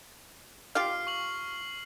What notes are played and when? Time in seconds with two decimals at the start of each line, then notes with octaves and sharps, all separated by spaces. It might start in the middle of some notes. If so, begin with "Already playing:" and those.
0.75 F4 G4 F5 F6 C7
1.07 C#6 F#7